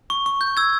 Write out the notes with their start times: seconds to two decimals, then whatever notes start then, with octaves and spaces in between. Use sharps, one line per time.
0.10 C#6
0.26 C#6
0.41 G6
0.57 E6 G#6